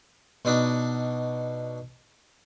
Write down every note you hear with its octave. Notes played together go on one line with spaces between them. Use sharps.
B2 D4 D#4